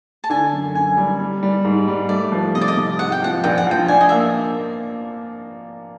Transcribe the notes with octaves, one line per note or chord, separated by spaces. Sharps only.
A5
D3 G#5
F#2
F#2 G#5
G3
G3
G3
G#2
G3
A3 D5
F3
C3 D#5
D5
D#5
C3
G#2 F#5
G5
F3 F#5
A#1 G5
F#5
F3 G5
D4 G#5
D#5
A#3 E5